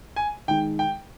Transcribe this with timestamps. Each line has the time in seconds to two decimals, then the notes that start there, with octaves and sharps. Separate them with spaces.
0.16 G#5
0.48 D#3 G#3 D#4 G#4 G5
0.79 G5